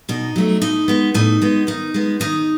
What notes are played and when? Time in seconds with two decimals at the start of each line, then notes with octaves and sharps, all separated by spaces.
0.09 B2 D#4
0.36 F#3 A3
0.62 A2 D#4
0.88 G#3 B3
1.14 A2 D#4
1.42 G#3 B3
1.67 D#3 D#4
1.94 G#3 B3
2.20 D#3 D#4